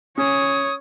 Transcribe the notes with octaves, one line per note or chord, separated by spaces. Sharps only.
C#4 C#5 D#6